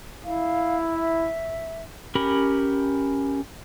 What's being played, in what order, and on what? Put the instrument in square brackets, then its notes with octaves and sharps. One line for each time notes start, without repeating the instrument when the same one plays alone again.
[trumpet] E4 [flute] F5
[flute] E5
[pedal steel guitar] C#4 G4 A#4 B5